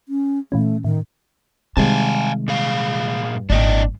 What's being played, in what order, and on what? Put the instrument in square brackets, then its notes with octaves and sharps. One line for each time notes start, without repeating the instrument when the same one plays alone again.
[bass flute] C#4
[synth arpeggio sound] A#2 E3 C#4 [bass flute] A3
[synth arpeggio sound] A2 [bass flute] D#3
[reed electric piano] C3 D#3 G#3 [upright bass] G3 [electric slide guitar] F5 G#5 A5
[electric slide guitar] A#2 G#4 F5
[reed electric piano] G2
[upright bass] G#1 A#2 [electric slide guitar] D4 D#5 G5